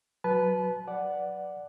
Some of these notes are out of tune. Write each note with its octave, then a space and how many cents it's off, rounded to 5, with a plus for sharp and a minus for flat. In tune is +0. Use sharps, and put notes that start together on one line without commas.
F#3 +0 B4 +0 A5 -30
D5 +0 F#5 +0